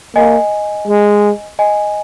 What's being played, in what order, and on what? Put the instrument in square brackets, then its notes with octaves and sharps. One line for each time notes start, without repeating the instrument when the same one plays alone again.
[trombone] A#3 [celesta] D#5 G#5
[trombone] G#3
[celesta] D#5 G#5